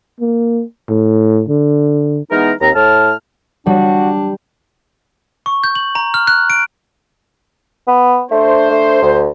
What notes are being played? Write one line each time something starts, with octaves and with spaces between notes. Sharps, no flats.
A#3
A2
D3
E3 G#3 B3 D#4 A#4
D#2 C4 A#5
A2 A5 F6
G3 D4 F#4
C#6
G6
F#7
A#5
F6
F#6
D7
B3
A3 D4 A4 C5
A3
D2